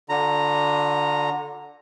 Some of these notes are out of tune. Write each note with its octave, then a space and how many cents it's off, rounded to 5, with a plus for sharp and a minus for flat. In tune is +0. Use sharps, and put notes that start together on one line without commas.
D3 +0 F4 +40 A#5 -5